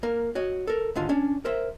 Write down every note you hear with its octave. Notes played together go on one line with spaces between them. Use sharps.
A#3 A#4
F#4 C#5 D#5
A4 A#4
D#2 G#2 D3 F4
C#4 D4
A#4 C5 E5